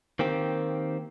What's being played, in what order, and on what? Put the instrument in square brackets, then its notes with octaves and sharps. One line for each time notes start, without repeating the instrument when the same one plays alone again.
[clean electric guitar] D#3 A#3 C4 G4